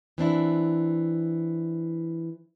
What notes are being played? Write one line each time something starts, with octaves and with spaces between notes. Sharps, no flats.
E3 C4 D4 E4